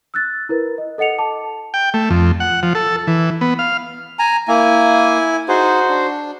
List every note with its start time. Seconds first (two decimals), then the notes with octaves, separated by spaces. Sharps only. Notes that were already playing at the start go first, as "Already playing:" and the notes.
0.14 E6 F#6 A6
0.49 E4 A#4 B4
0.78 D#5
0.98 A4 D#5 F#5 C#7 F7
1.18 A5 D6
1.74 G5
1.94 A3
2.10 F2
2.40 F#5
2.63 F3
2.75 A4
3.07 E3
3.41 B3
3.59 F5
4.19 G#5 A#5
4.48 A#3 E4 G#5
5.48 D#4 F#4 G#4 C5
5.89 D4